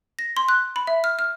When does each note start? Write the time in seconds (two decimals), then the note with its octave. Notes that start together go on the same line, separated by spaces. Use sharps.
0.19 A#6
0.37 C6
0.49 F#6
0.76 B5
0.87 E5
1.04 F6
1.19 F6